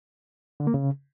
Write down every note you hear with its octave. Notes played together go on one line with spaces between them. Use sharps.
D3
A#3
C#3